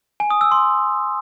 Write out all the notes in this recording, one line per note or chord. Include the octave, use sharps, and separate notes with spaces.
G#5
D#6
E6
C6